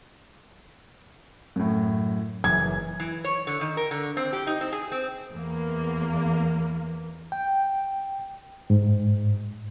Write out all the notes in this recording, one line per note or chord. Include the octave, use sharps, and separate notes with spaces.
F#2 A2
F#1 E3 G#6
E3
C#5
D3
D#3
A#4
D3
C4
G4
D#4
C4
G#4
C4
E2 A#3
G5
G#2